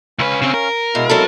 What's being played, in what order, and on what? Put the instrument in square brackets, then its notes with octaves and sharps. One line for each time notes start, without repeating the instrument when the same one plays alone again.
[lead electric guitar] C#2 B4 [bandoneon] C#4 F5
[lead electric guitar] C#3 C4
A#4
[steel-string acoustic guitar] B2 [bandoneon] G#3 E4 F5
[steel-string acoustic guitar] F#3 C4 A4